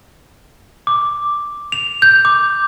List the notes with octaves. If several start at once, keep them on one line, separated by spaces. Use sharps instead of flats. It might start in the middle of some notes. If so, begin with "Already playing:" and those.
D6
F7
G6
D6